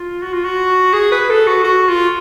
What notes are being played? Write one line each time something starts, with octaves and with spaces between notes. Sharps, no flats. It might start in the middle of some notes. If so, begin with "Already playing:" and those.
Already playing: F4
F#4
F4
F#4
G#4
B4
A4
F#4
F#4
F4